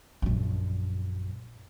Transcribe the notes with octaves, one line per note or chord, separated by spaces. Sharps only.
A#1 F#2